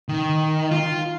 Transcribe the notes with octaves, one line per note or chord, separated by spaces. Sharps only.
D#3
F4